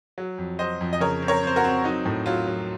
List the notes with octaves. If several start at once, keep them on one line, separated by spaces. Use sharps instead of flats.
F#3
F2
F#3 C5 D#5
F2
D#5
C#3 A#4 C#5
C4
A#4 C#5
C4 C5
F#4 A#4
C4
F#3 D#4
A2
F#3 F4
F#3